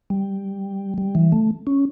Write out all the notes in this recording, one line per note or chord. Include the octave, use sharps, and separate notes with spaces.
G3
G3
E3
A3
C#4